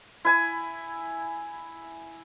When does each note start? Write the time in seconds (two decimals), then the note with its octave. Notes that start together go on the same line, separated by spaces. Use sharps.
0.25 E4 G#5